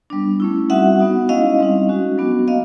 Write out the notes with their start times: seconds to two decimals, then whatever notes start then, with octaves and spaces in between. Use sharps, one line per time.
0.10 G3 B3 D4
0.40 A3 C#4 E4
0.70 G3 C4 D#4 F#4 E5 F#5
0.99 B3 D#4 F#4
1.29 G#3 C#4 E4 D#5 F5
1.59 G3 C4 D#4
1.89 G#3 C#4 F#4
2.18 F#3 B3 D4 F#4
2.48 A#3 D#5 F5